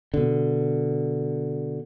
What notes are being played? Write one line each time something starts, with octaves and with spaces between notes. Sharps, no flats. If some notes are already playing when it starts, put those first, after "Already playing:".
B2 D3